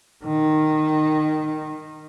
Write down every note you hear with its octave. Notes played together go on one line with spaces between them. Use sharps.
D#3